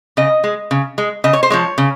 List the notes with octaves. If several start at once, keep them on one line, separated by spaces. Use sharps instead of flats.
C#3 D#5
G#3
C#3
G#3
C#3 D#5
C#5
C5
F3 G#3 C#5
C#3